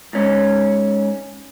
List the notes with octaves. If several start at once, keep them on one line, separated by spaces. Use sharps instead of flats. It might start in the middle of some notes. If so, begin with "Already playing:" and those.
G#2 C#4